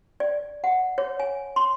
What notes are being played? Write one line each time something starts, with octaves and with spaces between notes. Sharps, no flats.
D5
F#5
C#5
G#5
C6